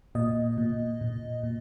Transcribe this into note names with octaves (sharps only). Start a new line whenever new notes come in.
A#2 D#5
A#2
A#2
A#2